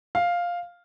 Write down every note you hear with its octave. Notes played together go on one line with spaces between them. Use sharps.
F5